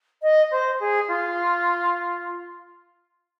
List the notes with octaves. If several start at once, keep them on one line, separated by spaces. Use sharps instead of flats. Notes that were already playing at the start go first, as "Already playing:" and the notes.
D#5
C5
G#4
F4